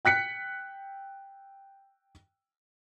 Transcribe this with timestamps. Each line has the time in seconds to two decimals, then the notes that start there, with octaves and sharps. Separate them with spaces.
0.05 G5 F#6 B6 C#7